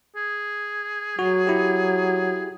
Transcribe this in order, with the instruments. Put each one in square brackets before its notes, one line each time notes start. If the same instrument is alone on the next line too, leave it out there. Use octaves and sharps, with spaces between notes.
[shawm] G#4
[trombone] F#3 [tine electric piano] F#4
[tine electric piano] E4 G4